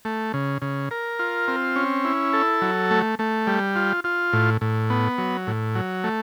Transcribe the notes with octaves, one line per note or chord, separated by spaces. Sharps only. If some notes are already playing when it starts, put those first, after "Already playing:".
A3
C#3
C#3
A#4
F4
C4
C#4
E4
A4
F#3
A3
A3
G3
F4
F4
A2
A2
B3
F#3
A2
F#3
A3